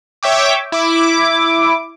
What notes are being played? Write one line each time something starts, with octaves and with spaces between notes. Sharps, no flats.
C#5 E5 G5 D6
E4 D6